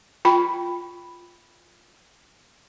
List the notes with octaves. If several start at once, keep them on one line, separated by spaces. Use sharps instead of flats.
F4 G5 B5